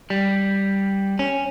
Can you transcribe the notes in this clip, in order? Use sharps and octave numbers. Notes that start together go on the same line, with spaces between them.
G3
C#4